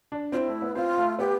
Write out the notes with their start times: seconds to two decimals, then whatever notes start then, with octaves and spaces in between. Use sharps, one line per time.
0.12 D4
0.32 C4 F4
0.37 E4
0.48 A3
0.62 B3
0.75 C4 F4
0.98 A3
1.19 B3 G4